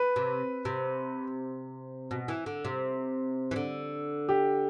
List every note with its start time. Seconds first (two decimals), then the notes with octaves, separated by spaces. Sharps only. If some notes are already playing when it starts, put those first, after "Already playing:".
Already playing: B4
0.16 C3
0.65 C3
2.11 B2
2.28 E3
2.46 D3
2.65 C3
3.51 E3
3.56 D3
4.29 G4